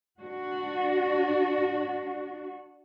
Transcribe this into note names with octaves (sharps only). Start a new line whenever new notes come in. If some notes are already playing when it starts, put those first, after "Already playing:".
D4 F#4